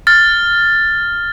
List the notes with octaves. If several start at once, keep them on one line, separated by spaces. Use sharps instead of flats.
F6 A6